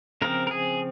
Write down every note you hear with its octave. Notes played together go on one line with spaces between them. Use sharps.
C#3 F3 C4 A#4
A#4
G#4